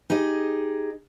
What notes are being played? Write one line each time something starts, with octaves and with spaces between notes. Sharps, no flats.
D#4 G4 G#4 D#5